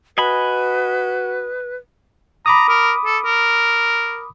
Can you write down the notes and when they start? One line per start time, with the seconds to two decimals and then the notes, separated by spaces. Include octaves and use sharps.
0.18 F#4 B4 D#5 G#5 B5
2.46 A#5 B5 D6 D#6
2.68 A#4
3.05 A4
3.25 A#4